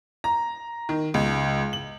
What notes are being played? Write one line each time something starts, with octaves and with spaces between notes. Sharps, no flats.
A#5
D#3
C#2
F#7